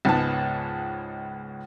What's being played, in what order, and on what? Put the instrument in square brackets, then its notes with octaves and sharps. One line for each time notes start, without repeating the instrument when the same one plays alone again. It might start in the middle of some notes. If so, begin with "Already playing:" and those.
[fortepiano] C#2 G#2 B3 A5